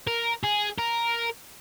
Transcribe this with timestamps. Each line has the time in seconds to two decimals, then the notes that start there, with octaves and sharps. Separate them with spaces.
0.07 A#4
0.43 G#4
0.78 A#4